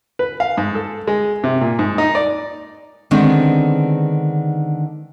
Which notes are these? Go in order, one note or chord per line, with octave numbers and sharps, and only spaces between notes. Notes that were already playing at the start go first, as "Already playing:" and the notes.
B4
F5
G#2
A4
G#3
C3
A#2
G#2
D#4
D5
D3 D#3 G#3 B3 C4 D4